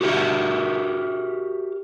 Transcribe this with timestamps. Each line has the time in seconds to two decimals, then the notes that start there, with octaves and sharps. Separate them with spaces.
0.01 F#4 G4 A#4 D#5 E5